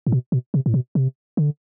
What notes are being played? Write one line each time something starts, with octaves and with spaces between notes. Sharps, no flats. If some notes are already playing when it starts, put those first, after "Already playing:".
A2
B2
B2
C3
A2
B2
C3
D3